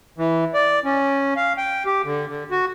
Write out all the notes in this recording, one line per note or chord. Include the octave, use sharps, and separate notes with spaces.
E3
D5
C#4
F5
G5
G4
D3
D3
F#4